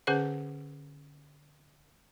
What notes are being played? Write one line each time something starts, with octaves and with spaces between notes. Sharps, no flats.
D3 C#4 G#4 B4 C5 F#5